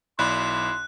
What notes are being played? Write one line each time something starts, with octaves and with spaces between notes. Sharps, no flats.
B1 E4 D5 B5 C6 F#6